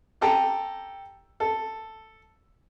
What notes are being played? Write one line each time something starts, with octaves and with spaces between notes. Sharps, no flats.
G4 A4 G5 A#5
A4